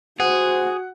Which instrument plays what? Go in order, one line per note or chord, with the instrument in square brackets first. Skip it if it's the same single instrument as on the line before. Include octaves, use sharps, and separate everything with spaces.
[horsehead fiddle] F#4 [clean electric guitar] G#4 [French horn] C5 [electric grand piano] F#5